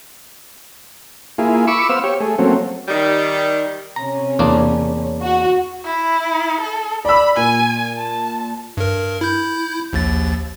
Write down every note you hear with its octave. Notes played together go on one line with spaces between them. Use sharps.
A#3 E4 F4 G#4
B5 C#6 D6 E6
B3 C5 F5 E6
G4 C#5
A3 G#4
F#3 A3 A#3 C4 C#4
D#3 G3
C3 C#4 A#5
E2 A#3 D4
F#4
E4
A4
D5 B5 E6
A#2 G#5
A5
G2 A#4
E4 G6
A#1 D#2 A6